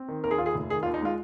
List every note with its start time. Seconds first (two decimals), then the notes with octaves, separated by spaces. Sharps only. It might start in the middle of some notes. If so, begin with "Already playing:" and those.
Already playing: C4
0.08 D#3
0.24 D#2 A#4
0.31 G#4
0.38 D#2 F4
0.46 G#4
0.54 F1
0.70 D#3 G#4
0.83 F4
0.86 D#2
0.94 D#4
1.02 G#3 F4